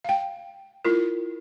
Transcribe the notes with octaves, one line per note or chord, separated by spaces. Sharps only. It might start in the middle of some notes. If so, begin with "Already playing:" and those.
F5 G5
E4 F4 A#4